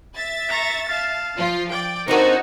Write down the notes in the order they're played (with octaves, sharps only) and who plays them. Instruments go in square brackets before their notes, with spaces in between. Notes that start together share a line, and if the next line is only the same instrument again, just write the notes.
[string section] E5 A6
[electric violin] A#5 C#6
F5 A5
[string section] F3 F4
[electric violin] D5 [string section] G5
[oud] C4 D4 A#4 [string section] D#4 F#4 A4 [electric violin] C#5 C#6